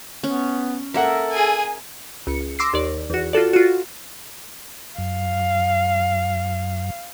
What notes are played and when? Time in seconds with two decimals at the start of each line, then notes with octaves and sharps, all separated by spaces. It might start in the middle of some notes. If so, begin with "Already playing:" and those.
0.23 B3 C#4
0.94 A#3 A4 A#4 E5 F#5
1.31 G#4 G#5
2.27 C#2 C#7
2.59 C6 D6 E6 A#6 C7
2.73 D#2 D5
3.10 E2 F#4
3.33 F4 F#4 A4 D5
3.53 F4 F#4
4.98 F#2 F5